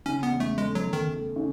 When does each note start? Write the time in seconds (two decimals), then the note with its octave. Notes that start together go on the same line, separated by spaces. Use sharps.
0.06 C#3 C#4
0.23 B3
0.32 E2
0.40 A3
0.58 G#3 A3
0.75 F#3
0.84 A3
0.93 D#3
1.10 A3
1.36 C#3